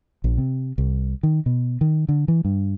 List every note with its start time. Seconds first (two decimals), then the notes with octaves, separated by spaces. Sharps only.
0.24 A#1
0.38 C3
0.78 C2
1.23 D#3
1.46 B2
1.81 D#3
2.09 D3
2.28 E3
2.45 G2